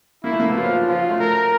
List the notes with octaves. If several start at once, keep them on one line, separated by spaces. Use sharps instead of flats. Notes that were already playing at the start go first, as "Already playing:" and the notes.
A#3 E4
A3
A#3
B3
F#3 F4
F3
F3 F4
F#3
A3
A#4